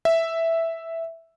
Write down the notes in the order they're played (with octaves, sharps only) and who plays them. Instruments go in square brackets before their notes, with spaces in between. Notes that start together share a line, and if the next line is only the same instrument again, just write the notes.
[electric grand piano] E5